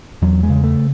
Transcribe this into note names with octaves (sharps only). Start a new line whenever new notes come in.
E2 F#3
G#3
C#3
A3